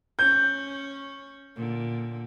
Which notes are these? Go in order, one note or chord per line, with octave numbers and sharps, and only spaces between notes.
C#4 G6
A#2 D3